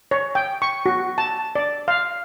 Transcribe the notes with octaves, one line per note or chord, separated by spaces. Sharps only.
C#5
G5
C#6
F#4
A5
D5
F5